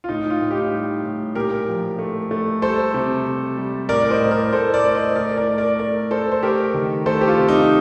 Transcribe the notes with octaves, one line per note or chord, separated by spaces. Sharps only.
F4
A2 D#4
F4
A2
D#4 G4
G3
A2
A#2 G4 A#4
F3
A3
A3
G3 A4 C5
C3
C3
G3
A2 A#4 D5
C5 D#5
A2
A#4 D5
A2 A4 C5
A#4 D5
A3
C5 D#5
A2 A#4 D5
A#4 D5
A3
A#4 D5
A3 A#4 D5
A3 A4 C5
C5
A3 G4 A#4
D#3
A3 A4 C5
G4
F4
C3
D#4